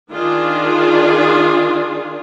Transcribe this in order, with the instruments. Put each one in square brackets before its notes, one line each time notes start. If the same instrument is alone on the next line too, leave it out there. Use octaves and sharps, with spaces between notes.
[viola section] D#3 D4 F4 G#4